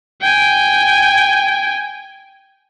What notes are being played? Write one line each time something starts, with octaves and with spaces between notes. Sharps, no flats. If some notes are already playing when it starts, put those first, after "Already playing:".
G5 G#5